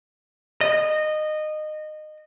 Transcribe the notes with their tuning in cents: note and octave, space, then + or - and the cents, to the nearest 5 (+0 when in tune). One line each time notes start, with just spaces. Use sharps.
D#5 -20